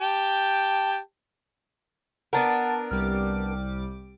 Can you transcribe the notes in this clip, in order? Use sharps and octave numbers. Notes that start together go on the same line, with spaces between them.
G4 G5 A5
B3 D4 A#4 F#5 A5 A6
C2 G3 D6 F6